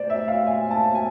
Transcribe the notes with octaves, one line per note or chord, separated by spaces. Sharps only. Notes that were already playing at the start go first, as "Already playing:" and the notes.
Already playing: C5 D5
E5
F5
G#5
A5
G#5